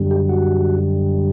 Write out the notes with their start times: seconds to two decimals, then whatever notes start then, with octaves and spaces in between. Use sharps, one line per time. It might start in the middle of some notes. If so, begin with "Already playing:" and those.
Already playing: F#2 D3 G3
0.11 G4
0.29 F#4